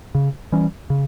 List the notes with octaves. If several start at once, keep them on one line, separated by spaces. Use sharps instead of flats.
C#3
E3 G3 C#4
C#3